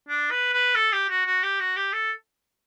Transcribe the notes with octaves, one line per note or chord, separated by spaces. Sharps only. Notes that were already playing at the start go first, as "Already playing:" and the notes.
D4
B4
B4
A4
G4
F#4
F#4
G4
F#4
G4
A4